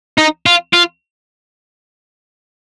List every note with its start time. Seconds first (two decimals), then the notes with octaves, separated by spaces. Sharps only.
0.18 D#4
0.46 F4
0.74 F4